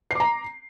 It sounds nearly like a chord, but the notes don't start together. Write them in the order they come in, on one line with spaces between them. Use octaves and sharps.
C7 D6 A#5